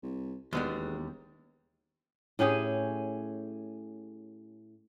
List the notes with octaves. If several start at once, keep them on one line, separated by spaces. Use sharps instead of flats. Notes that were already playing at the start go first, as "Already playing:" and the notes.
C2
E1 D#2 G3 G#3 B3
A2 C#4 G4 G#4